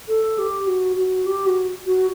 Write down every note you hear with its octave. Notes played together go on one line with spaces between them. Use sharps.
A4
G4
F#4
F#4
G4
F#4
F#4